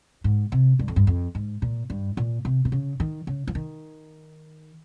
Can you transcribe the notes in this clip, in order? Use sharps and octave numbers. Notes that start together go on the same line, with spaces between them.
G#2
C3
G2
F2
G2
F2
G#2
A#2
G2
A#2
C3
C3
C#3
D#3
C#3
F3
D#3